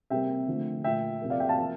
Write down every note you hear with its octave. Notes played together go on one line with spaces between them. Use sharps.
C3 G3 A#3 E5 G5
D3 F3 A3
A#2 A3 E5 G5
C3 F3 A#3
D5 F5
E5 G5
F5 A5
F3 A#3